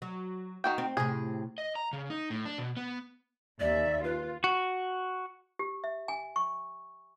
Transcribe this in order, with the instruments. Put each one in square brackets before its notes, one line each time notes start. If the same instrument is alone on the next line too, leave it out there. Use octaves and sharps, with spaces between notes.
[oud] F#3
[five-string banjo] D#3 F#4 G5
[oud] C4
[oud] A2 C3 [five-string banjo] G#4
[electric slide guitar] D#5
A#5
C#3
D#4
A2
D4
B2
B3
[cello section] D#2 E5 [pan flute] D5
[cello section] F4 [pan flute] B4
[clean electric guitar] F#4
[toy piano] G4
E5
G#5
C#6